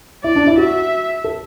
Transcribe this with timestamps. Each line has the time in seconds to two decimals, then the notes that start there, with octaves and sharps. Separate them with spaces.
0.24 E4 D5
0.36 D4
0.47 E4
0.58 F#4 E5
1.24 A4